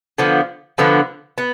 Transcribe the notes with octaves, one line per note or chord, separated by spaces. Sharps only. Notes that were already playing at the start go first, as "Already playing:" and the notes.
D3 F3 B3
D3 F3 B3
B3